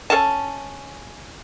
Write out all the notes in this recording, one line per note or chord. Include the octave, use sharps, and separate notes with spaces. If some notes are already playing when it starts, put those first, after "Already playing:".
C#4 A4 F5 A5